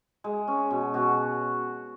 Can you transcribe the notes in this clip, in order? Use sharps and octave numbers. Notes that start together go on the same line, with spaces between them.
G#3
C#4
B2
B2 F#4